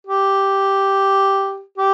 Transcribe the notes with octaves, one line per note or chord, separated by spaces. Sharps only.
G4
G4